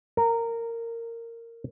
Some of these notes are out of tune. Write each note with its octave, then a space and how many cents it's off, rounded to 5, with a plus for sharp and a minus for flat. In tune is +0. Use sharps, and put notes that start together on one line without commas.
A#4 -15